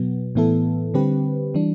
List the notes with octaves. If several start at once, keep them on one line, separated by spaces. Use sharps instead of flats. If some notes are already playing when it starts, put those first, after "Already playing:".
Already playing: B2 F#3 B3
A2 E3 B3 E4 A4
D3 G3 C4 G4 B4
E3 G3 D4